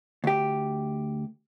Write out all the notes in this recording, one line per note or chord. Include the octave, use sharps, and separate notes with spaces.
D2 G4